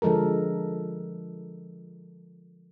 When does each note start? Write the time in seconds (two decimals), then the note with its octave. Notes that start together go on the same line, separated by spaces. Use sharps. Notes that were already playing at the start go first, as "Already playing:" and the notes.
0.02 D3 F3 G#3 A4 A#4